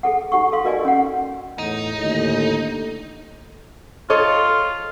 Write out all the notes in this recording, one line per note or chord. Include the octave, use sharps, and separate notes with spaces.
G#4 A4 F#5
D#4 G4 F#5 C#6
A4 F5 C6
F#4 A#4 D5 D#5 G#5
C#4 F#5
E2 A2 D#4
D#2 A2 D3
F4 A4 C#5 D#5